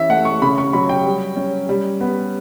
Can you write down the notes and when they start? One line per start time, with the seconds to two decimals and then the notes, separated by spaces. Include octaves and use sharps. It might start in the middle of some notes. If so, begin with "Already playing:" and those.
Already playing: E3 C#4 E5
0.10 A3 F#5
0.25 C#6
0.42 C#3 B5
0.58 C#6
0.73 F#3 B5
0.89 G5
1.05 G3
1.36 C#4
1.69 G3
2.01 B3